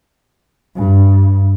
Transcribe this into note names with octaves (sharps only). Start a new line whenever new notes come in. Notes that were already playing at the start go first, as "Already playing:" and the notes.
G2